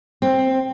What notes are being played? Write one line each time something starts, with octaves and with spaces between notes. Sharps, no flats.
C4